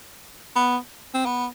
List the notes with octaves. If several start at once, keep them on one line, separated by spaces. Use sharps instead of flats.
B3
C4
B3